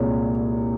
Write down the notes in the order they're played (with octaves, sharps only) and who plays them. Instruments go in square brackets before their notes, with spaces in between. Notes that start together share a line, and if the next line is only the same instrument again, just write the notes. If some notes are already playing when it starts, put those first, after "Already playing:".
Already playing: [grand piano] C2 A#2 G#3 C#5